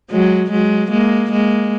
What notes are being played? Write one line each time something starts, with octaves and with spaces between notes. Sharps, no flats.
F#3 G#3
F#3 G#3
G#3 A#3
G#3 A#3